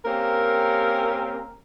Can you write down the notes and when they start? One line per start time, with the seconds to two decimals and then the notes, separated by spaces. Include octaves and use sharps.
0.05 A#3 C4 C#4 G4 A#4